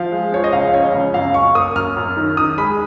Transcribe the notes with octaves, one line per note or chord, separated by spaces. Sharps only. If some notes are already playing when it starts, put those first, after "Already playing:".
Already playing: F3 F5
G#3
F3 C#5
D#5
C#2 F5
C#3 C#5
D#5
C#2
F#2 F5
F#2 C#6
A#3 D#6
F#2 F6
F#2
D#3
D#3 D#6
G#3 B5